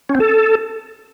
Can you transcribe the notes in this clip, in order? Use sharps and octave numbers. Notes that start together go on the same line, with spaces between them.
C#4
C4
A4